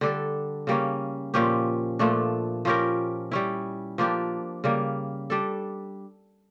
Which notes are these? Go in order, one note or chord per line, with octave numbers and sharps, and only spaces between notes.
D3 G3 D4 A4
C#3 G3 A#3 C#4
A#2 F3 C#4 G4
A#2 F3 A3 D4
F3 C#4 G4 A#4
G3 C#4 E4
F3 A#3 D4 G4
C#3 G3 A#3
G3 D4 A4